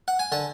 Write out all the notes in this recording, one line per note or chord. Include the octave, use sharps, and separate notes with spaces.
F#5
G#5
D3 A5